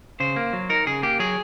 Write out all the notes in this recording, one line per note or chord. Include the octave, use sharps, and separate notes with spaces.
C#3 C5
A#3
F#3
D#4 A#4
C#3 G#4
A#3 G4
F#3 G#4